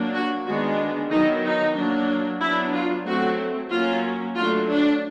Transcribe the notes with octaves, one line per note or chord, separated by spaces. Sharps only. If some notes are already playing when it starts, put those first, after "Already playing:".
Already playing: F#3 A#3 D4
F#4
D#3 G#3 B3 D4 F#4
D#3 F#3 B3 D#4
D#4
F#3 A#3 D4
F#3 B3 D4 E4
F4
F#3 A3 C4 F#4
F#3 A#3 C#4 F4
F#3 A3 D4 F4
D4